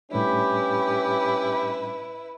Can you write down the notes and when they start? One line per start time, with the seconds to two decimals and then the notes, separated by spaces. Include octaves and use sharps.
0.11 A2 G3 C#4 D4 E4 G4 B4